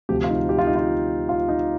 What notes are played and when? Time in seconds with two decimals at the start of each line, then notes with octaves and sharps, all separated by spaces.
0.09 D2 C3 F3 G4
0.24 F4
0.29 D#4
0.49 G4
0.59 F4
0.67 D#4
0.76 F4
1.29 F4
1.49 D#4